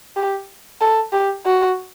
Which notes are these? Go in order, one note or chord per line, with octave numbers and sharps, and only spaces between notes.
G4
A4
G4
F#4